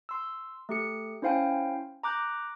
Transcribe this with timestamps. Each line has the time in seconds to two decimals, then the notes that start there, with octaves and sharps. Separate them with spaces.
0.09 C6 E6
0.69 A3 G4 C#7
1.22 C#4 E4 C5 F5 G5 G#5
2.03 A#5 D6 F#6 G6